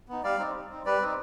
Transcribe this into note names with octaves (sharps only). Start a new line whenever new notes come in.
B3 D#4
G3 D5 F5
C4 D#4
G3
C4 D#4
G3 B4 D5
C4 D#4